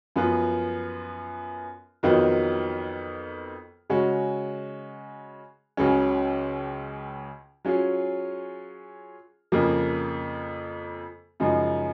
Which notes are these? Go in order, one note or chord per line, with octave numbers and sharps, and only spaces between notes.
F#2 F3 B3 F4 B4
F2 D#3 F#3 B3 F4
C#3 G#3 C#4 F#4
C#2 C#3 F#3 C#4
F#3 C#4 F4 G#4
F2 C#3 F3 A#3
F#2 C#3 F3 G#3 D#4